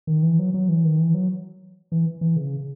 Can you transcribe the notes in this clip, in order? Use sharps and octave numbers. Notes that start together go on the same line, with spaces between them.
D#3
E3
F#3
F#3
E3
D#3
E3
F#3
E3
E3
C#3